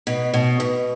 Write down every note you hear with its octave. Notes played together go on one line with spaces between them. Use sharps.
B2
B2
B2